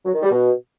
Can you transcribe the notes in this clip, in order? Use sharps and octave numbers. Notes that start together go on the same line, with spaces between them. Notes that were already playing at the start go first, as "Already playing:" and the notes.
F#3
D#3
G3
B2